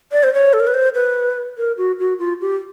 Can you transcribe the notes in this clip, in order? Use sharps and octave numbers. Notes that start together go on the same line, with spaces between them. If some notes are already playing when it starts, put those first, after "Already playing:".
D5
C5
C#5
A4
A#4
B4
C5
B4
A#4
F#4
F#4
F4
G4